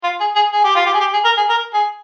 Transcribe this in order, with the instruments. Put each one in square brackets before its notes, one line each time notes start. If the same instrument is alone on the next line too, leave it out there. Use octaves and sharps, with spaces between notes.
[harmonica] F4
G#4
G#4
G#4
G4
F4
G4
G#4
G4
G#4
A#4
G#4
A#4
G#4